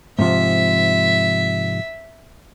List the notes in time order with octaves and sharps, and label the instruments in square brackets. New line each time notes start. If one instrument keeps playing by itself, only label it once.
[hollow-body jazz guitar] G#2 C3 F3 [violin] E5